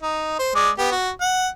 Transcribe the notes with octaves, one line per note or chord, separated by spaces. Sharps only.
D#4
C5
G#3 D5
B3 G4
F#4
F#5